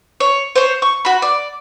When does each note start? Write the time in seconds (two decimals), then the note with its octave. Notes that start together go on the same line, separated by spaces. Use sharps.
0.20 C#5
0.56 C5 C#5
0.82 C#6
1.05 F#4 B5
1.22 D5